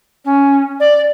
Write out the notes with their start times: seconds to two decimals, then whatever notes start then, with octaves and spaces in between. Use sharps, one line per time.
0.25 C#4
0.80 D5